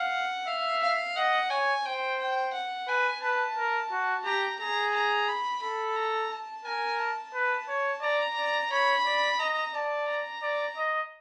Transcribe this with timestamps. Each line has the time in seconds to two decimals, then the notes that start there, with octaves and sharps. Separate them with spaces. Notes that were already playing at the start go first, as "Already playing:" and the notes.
Already playing: F5 F#5
0.47 E5 F5
0.83 F5
1.16 D#5 F#5
1.50 C#5 G#5
1.85 C5 G5
2.19 G5
2.53 F#5
2.88 B4 G#5
3.23 B4 A5
3.57 A#4
3.91 F#4
4.25 G4 A#5
4.59 G#4 A#5
4.94 A#5
5.28 B5
5.62 A4 B5
5.96 A#5
6.32 A5
6.65 A#4 G#5
6.99 A5
7.34 B4
7.68 C#5
8.02 D5 A#5
8.37 D5
8.71 C#5 B5
9.06 D5
9.39 D#5 A#5
9.75 D5 A5
10.08 A#5
10.42 D5
10.77 D#5